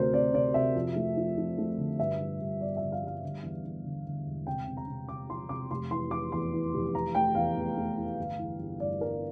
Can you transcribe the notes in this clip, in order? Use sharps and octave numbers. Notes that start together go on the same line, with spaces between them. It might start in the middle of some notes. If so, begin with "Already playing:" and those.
Already playing: D2 C3 A3 A#4 C5
C3 D5
C3 D5
C3 E5
F2
A3
F3
F3
A3
D3
G2 E5
G3
G2
G1 D5
D3 E5
F5
G3 F5
D3
E2
E2
D3
D3
E1
C3 G5
C3
A#5
C3
C3 D6
F3 C6
C3 D6
F1 C6
E3 C6
E3 D6
E2 C6
E3
F1
E3 A#5
A3 G5
E2 F5
E2
A3
E3
G1
E3
G1
G2 D5
G2 A#4